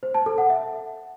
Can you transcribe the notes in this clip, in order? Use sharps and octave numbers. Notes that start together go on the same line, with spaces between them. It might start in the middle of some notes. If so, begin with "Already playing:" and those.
C5
A5
A4
F#5
E5